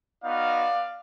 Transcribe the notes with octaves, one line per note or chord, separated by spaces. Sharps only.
B3 D#4 F#4 D5 F5